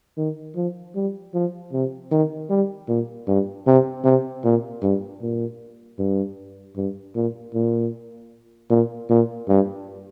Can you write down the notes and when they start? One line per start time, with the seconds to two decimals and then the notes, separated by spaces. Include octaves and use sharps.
0.17 D#3
0.56 F3
0.95 G3
1.34 F3
1.72 C3
2.11 D#3
2.50 G3
2.88 A#2
3.28 G2
3.67 C3
4.05 C3
4.44 A#2
4.82 G2
5.22 A#2
5.99 G2
6.77 G2
7.15 A#2
7.54 A#2
8.70 A#2
9.10 A#2
9.48 G2